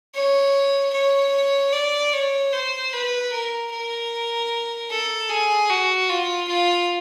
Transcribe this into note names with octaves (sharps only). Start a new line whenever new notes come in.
C#5
C#5
D5
C#5
C5
B4
A#4
A#4
A4
G#4
F#4
F4
F4